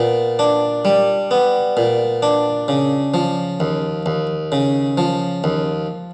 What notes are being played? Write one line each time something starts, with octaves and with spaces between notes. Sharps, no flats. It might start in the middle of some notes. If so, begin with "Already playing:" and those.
Already playing: A#2 B3
D4
G3
B3
A#2
D4
C#3
F3
D#2
D#2
C#3
F3
D#2